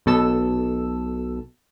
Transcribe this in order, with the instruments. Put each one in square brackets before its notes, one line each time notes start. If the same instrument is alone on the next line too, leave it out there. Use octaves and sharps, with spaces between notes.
[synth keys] B1 B2 A4 E6